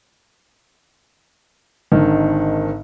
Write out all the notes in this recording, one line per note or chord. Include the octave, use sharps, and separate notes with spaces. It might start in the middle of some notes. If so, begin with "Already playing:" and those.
G#1 D3 D#3